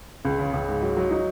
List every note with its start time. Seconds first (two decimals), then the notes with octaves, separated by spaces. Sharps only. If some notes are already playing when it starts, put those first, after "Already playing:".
0.25 C#2
0.39 C#3
0.54 C#2
0.69 G#2
0.83 F#3
0.97 F#3
1.11 D#4